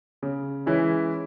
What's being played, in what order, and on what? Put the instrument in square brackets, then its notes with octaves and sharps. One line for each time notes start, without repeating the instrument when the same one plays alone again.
[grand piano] C#3
E3 G#3 C#4 E4